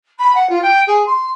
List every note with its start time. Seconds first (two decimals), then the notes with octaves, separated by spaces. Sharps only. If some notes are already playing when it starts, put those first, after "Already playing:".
0.19 B5
0.35 F#5
0.49 F4
0.62 G5
0.87 G#4
1.06 C6